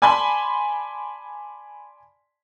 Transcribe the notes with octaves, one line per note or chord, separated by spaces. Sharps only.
D5 G#5 A5 B5 C6